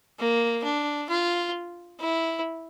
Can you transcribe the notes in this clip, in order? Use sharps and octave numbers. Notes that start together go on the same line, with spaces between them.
A#3
D4
F4
E4